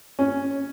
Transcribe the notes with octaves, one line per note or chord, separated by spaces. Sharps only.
C#4